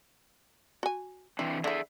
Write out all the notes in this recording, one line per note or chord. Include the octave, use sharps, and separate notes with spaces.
F#4 G#5
E3 C4 D4 E4
D3 E4 G#4 E5